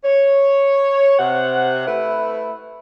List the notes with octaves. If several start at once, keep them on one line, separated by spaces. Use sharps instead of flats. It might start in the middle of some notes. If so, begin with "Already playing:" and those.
C#5
C3 F#5
A3 E4 B4